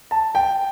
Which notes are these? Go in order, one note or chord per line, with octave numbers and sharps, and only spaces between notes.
A5
G5